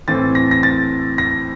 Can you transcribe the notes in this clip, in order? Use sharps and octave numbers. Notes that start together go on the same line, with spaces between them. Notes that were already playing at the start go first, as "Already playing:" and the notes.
A2 E3 A3 C4 A6
A#6
A#6
A6
A#6